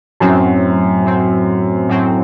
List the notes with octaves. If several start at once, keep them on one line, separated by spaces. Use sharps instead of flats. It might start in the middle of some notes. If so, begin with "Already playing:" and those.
F#2 A2 F#3 C4
A2 F#3 C4
A2 F#3 C4